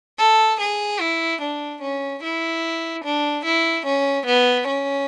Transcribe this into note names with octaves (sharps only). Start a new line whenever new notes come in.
A4
G#4
E4
D4
C#4
E4
D4
E4
C#4
B3
C#4